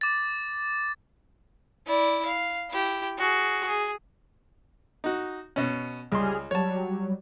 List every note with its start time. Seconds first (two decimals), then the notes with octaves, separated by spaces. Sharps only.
0.01 D6 A6
1.87 E4 D5
2.25 F5
2.70 E4 G4
3.19 F#4 G#4
3.66 G#4
5.04 D#4 F#4
5.56 B2 C#4
6.12 C#2 G3 G#4 C6 F6
6.51 F#3 G3 C#5 A5